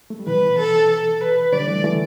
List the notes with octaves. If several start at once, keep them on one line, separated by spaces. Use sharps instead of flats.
A3
G3
B2 E3 B4
A4
A4
B4
D3 G3 D5
E3 A3
E3 A3